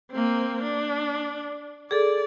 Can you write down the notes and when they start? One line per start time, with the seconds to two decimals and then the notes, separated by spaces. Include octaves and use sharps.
0.12 A#3 C4
0.64 D4
1.91 G#4 A4 D5